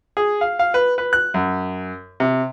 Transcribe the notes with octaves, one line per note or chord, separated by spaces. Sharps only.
G#4
F5
F5
B4
B4
F#6
F#2
C3